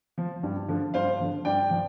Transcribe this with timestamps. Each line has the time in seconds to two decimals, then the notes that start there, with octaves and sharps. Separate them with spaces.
0.18 F3
0.43 G2
0.68 D3 F3
0.94 G2 C5 F5
1.20 D3 F3
1.45 G2 D5 G5
1.70 F3